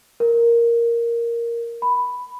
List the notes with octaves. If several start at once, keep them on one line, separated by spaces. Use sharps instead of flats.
A#4
B5